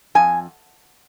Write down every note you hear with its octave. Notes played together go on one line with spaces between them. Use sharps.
F2 G#5